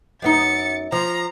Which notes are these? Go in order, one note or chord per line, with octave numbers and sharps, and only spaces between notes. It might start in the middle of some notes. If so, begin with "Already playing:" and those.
F#2 B3 D#4 A6 C#7
F3 A#5